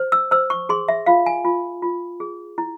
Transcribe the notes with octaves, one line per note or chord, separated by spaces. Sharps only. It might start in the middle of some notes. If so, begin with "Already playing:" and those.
Already playing: C5
E6
C5 E6
C#6
G#4 C6
E5
F4 F5
G#5
F4
F4
G#4
E4